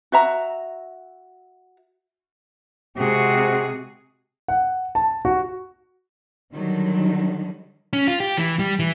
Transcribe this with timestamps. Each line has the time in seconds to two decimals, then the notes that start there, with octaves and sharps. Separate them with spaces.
0.12 F#4 E5 A#5
2.98 C3 G#3 C4 F#4 G#4
4.48 F#5
4.95 A5
5.25 F#4
6.53 D3 D#3 F#3 G3
7.93 C#4
8.07 F4
8.20 G4
8.37 E3
8.59 G3
8.79 E3